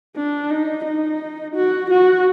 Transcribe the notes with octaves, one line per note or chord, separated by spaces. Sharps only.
D4
D#4
D#4
F#4
F#4